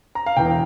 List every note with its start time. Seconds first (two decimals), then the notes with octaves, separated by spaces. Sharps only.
0.15 A#5
0.26 F5
0.36 E1 E2 E3 G5